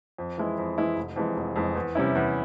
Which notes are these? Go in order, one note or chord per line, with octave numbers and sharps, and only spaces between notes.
F2
E3 G#3 E4
F2
E3 G#3 E4
F1
F2 E3 G#3
F1
F2 E3 G#3
E2
C3 G3 C#4 E4
E2